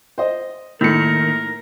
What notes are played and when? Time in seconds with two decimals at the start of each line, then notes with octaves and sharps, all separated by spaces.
0.18 C5 D#5
0.81 A2 D#3 F3 A3 A#3 A#4 C#7